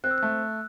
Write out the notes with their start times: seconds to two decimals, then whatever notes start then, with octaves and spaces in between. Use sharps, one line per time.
0.04 C4 F#6
0.11 E6
0.18 A3 F#6